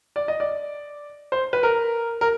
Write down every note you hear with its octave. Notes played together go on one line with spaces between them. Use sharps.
D5
D#5
D5
C5
B4
A#4
A#4